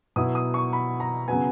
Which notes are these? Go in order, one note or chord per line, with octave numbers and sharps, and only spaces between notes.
B2 F#3 B3 E4 D#6
D#6
C#6
B5
A#5
C#3 F#3 B3 G#5